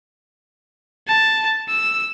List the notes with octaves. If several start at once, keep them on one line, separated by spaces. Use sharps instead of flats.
A5
E6